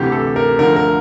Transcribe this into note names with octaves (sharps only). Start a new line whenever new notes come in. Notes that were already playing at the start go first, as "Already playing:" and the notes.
Already playing: D2 C3 E3 G4
A4
A#4
D2 D3 F3 A#4
A#4